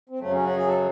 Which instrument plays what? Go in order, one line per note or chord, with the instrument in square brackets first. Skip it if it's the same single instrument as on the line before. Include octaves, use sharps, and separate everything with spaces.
[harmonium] C4
F#2 C#3 F#3 A3
C#4
F#4
G#4
A4